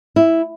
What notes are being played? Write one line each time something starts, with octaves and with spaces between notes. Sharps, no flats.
E4